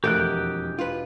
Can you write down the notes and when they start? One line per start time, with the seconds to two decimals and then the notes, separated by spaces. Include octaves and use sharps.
0.04 E1 F2 A3 G4 A#4 G5 D#6 F#6
0.79 F4 B4